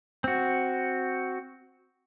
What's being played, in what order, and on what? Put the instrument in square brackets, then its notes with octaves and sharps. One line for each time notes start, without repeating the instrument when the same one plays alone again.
[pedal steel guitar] C4 F#4